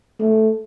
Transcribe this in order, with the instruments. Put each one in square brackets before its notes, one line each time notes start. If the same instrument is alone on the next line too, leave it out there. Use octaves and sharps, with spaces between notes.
[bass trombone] A3